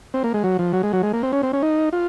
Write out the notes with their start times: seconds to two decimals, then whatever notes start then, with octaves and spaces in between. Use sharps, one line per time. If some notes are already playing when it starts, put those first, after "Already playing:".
0.14 C4
0.24 A#3
0.34 G#3
0.44 F#3
0.59 F3
0.73 F#3
0.83 G#3
0.93 F#3
1.03 G#3
1.13 A#3
1.23 C4
1.33 C#4
1.43 C4
1.53 C#4
1.62 D#4
1.93 F4